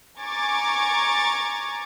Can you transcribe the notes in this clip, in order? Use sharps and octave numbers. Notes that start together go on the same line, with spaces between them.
G#5 A#5 C#6 D6 G#6 A6